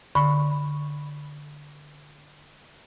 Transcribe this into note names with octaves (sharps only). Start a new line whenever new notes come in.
D3 B5 C#6